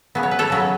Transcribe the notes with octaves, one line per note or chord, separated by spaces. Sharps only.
C#3 F#3 B3
C#5
B4
A4 C#5
C#3 F#3 B3